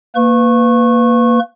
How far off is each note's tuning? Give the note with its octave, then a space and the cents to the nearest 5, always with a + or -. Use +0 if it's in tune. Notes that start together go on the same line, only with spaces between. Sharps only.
A#3 +0 B4 +20 C#6 -20